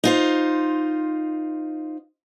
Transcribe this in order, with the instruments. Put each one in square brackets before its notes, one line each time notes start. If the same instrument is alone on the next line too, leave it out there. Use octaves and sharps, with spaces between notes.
[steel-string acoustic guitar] D#4 F4 C5